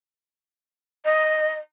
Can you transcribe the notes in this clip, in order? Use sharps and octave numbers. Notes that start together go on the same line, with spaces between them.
D#5